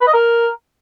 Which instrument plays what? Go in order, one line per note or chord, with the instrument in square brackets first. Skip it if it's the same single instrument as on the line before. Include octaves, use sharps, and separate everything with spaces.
[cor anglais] B4
D#5
A#4